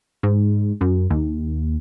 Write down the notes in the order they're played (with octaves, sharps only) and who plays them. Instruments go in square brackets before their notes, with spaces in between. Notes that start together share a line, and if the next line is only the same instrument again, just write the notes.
[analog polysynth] G#2
F#2
D#2